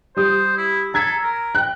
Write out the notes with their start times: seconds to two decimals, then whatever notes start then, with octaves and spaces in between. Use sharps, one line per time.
0.17 G3 C5 D#6
0.57 E4
0.94 A4 A#5 G#6 B6
1.23 A#4
1.55 G5 F#6